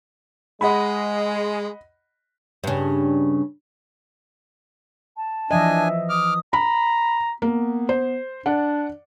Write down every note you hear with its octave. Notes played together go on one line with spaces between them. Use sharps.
G#3 D#5 F#5 B5
G2 C#3
A5
E3 F3 D4 D#5 E5 G#5
D6 D#6 F6
A#5 B5
A#3 B3
C5
D4 D5 F#5